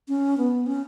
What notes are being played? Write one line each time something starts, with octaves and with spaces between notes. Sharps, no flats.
C#4
B3
C#4